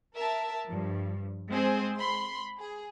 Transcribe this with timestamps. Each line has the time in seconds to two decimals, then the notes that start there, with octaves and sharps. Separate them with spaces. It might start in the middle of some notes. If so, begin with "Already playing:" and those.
0.15 A#4 E5 A5
0.66 G2 F3
1.50 G#3 C4 G#4 C5
1.98 B5 C6
2.59 G#4